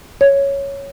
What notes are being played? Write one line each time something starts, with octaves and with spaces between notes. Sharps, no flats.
C#5